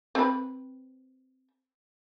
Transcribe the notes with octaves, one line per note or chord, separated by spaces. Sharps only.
C4 B4